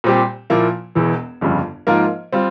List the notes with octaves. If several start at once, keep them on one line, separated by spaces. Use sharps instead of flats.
A#2 G3 C4 G4
A#2 F3 A#3 E4
E1 E2 E3
G1 F2 C#3 G3
G#2 F3 A#3 F4 A#4
G3 C4 F4